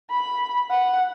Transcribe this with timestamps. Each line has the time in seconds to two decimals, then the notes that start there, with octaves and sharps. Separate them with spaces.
0.10 B5
0.71 F#5